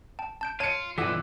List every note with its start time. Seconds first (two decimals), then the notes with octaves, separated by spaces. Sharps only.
0.19 G5 A5
0.41 A5 G6 D7
0.60 F4 C#5 A5 C#7 D#7
0.98 B1 G2 E3 F4 A4 F#5 D6 B6